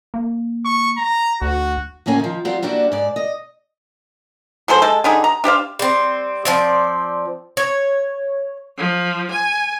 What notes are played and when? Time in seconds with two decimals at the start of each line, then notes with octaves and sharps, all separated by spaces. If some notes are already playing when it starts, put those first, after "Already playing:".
0.14 A#3
0.65 C#6
0.97 A#5
1.42 D2 F#4
2.06 D2 A2 A#3 C#4 G#5
2.20 D#3 F3
2.45 F#3 G3 C4 F4
2.62 G3 A#3 D4 E4 F#4
2.92 G#2 D5
3.16 D#5
4.68 F#3 G#4 A4 C5
4.82 G#3 A4
5.04 D3 G3 D#4 G#4
5.24 A#5
5.44 D4 G4 C5 F5
5.79 G3 C4
6.45 F3 C4 D5
7.57 C#5
8.77 F3
9.31 G#5